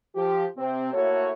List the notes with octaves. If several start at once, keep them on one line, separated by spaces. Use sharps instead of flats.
F3 G4
C3 C4
A3 A#3 E4 F#4 A4 C#5